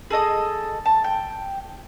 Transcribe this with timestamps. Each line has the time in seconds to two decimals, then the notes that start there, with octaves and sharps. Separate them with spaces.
0.10 G#4 A4 D#5 D#6
0.86 A5
1.04 G5